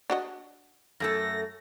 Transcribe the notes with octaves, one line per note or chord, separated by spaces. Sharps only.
D4 F#4 D#5
F#2 A3 A4 A#6